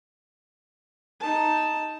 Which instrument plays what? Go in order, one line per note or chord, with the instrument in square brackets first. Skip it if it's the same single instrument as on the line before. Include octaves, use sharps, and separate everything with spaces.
[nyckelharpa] D#4 A5